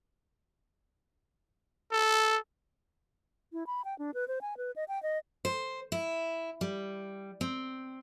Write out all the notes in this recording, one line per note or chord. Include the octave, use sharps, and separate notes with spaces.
A4
E4
B5
G5
D4
B4
C5
G#5
B4
D#5
G5
D#5
C5
E4
G3
C4